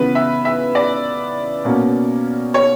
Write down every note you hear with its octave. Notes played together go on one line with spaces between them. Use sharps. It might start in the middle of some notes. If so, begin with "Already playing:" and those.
Already playing: C#3 E3 B3 B4
E5
E5
D5
B2 A#3 C#4
C#5